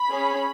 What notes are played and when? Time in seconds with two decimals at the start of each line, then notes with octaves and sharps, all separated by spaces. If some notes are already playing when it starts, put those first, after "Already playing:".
Already playing: B5
0.11 C#4 G#4